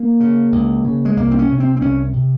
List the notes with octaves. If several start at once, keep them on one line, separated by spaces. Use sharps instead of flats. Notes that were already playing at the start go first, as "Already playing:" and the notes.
Already playing: A#3
C#3
C#2
C#3
G#3
C2 A#3
C4
C#4
C3
C4
C4
C2 C#4
C3